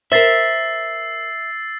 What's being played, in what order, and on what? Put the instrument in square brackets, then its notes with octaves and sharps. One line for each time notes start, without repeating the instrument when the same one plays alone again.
[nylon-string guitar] A#4 C5 [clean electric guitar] E5 [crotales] E6 A6 C7